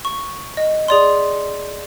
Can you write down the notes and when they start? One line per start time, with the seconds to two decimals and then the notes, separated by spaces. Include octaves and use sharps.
0.05 C#6
0.57 D#5
0.88 G#4 D5 C6